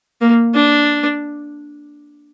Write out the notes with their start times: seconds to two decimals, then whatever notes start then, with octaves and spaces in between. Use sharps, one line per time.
0.21 A#3
0.55 D4